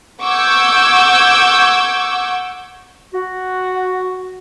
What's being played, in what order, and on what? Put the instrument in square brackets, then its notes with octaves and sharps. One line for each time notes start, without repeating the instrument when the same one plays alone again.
[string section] F#5 C#6 D6 E6 G6 G#6
[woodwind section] F#4